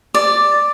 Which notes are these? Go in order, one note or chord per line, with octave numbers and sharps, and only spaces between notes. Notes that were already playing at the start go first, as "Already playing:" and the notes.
D5